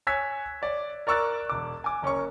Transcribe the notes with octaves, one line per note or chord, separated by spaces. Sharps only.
C#5 G#5 E6 F#6 G#6 B6
C#5 D5
A#4 D5 C#6 E6 F#6 A6
E1 D6
G#5 D6
F#1 C#4 A#4 C#6